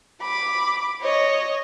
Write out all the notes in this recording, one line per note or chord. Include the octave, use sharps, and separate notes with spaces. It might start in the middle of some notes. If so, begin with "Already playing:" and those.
B5 D6
C#5 D#5